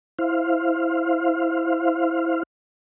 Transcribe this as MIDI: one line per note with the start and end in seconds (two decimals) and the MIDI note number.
0.19 2.43 64
0.19 2.43 72
0.19 2.43 77